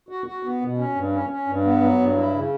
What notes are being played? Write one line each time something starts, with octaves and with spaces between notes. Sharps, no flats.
F#4
F#4
B3
B2
C#4
G2
C#4
C#4
G2
B3
F#3
G2
E4
C#3